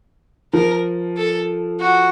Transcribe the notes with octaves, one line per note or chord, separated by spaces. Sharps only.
F3 A#4
A4
F#4